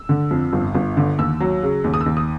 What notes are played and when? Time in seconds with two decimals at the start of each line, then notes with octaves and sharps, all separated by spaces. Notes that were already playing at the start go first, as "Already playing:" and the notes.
Already playing: E6
0.09 D3
0.31 F2
0.53 G1
0.75 G1
0.97 D3
1.19 D#2 E6
1.40 F#3
1.63 C#3
1.84 D#2
1.94 D#6
2.01 E6
2.06 D#2
2.17 D#6